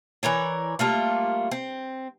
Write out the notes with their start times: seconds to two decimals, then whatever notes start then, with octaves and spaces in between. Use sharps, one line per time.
0.23 E3 A#4 C#5 D5
0.79 G3 A3 A#3 F4
1.51 C4